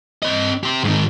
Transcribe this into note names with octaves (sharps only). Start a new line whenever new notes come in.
C4 D#5
G4 C5
G#2 D#3